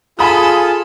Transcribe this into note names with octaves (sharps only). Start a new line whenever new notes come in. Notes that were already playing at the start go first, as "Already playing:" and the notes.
F4 G#4 A4 G#5 B5 D#6